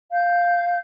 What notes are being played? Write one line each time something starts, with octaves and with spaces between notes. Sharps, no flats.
F5 G6